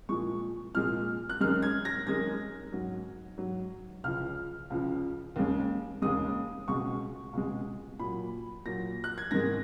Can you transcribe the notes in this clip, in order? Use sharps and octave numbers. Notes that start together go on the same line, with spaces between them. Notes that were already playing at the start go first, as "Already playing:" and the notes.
A#2 F3 G#3 C#6
A#2 F3 G#3 F6
F#6
F#2 D#3 G#3 F6
G#6
A#6
F#2 D#3 G#3 G#6
G#2 F#3
G#2 F#3
C#2 C#3 F3 F6
C#2 C#3 F3
D#2 C#3 G#3
D#2 C#3 G#3 D#6
C#2 B2 G#3 C#6
C#2 B2 G#3
A#2 F#3 B5
A#2 F#3 A#6
F#6
G#6
G#2 D#3 G#3 A#6